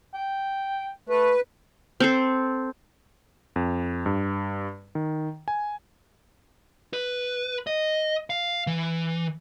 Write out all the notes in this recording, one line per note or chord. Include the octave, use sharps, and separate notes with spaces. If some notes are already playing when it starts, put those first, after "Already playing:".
G5
A3 B4
C4 A4 C5
F2
G2
D#3
G#5
B4
D#5
F5
E3